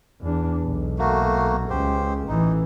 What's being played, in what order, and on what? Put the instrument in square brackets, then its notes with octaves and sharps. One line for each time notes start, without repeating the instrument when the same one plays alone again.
[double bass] E2 D4
B1
[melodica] A3 A#3 F#4
[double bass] C#2 [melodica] G4 C5
[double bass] A1 E3 [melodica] D#4